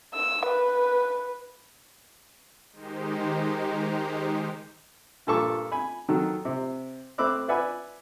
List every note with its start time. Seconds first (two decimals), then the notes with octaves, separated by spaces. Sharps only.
0.15 E6
0.47 B4
2.72 D#3 G#3 D#4 G4 C5
5.27 G2 A#2 A4 A5 C#6 D6
5.72 G#5 B5
6.08 D#3 F#3 A4
6.45 C3
7.18 A3 C4 B5 D6 E6 F#6
7.48 B4 D5 E5 F#5 G#5 B5